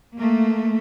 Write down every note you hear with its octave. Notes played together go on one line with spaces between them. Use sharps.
A3 A#3